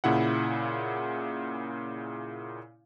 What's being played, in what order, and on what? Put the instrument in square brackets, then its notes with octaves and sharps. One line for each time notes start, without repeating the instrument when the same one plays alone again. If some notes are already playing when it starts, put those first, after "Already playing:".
[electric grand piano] A#2 C#3 E4 F#5